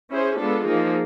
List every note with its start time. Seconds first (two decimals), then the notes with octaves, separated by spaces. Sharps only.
0.10 C#4 E4 G#4 C5
0.38 G#3 B3 D4 F4 A4
0.66 F3 A#3 D#4 G#4